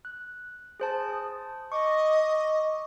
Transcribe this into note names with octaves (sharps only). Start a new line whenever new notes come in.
F#6
G#4 C5 A5
D#6
D#5 C#6 D6